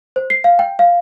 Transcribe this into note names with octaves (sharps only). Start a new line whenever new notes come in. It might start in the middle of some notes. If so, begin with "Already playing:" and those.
C5
C7
F5
G5
F5